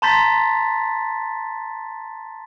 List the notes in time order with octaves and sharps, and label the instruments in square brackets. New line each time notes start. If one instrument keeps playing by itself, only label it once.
[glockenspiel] A5 A#5 C6 G6 A6 B6